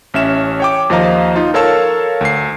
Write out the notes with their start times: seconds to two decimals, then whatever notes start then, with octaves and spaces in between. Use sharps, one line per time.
0.14 A1 C#4 E5 E7
0.60 C#5 G5 D6
0.90 D#2 F3 C5 D#5 F5 A#5
1.36 D#4 F4
1.54 A4 A#4 C#5 F5 A5 E6
2.21 D2 C7